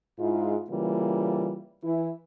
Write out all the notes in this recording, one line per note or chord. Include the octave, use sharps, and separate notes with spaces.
G#2 G#3 E4 F4
C#3 E3 G3 A#3 F4
E3 E4